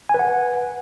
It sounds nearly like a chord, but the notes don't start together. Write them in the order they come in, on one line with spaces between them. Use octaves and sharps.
G#5 B4 F#5